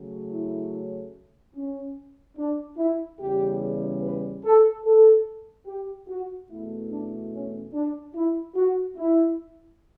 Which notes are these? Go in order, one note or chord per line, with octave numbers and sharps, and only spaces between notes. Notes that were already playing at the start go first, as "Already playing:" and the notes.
Already playing: C#3 F#3 A3 C#4
E4
C#4
D4
E4
E2 C#3 G3 G4
B4
A4
A4
G4
F#4
E2 B2 A3 E4
D4
C#4
D4
E4
F#4
E4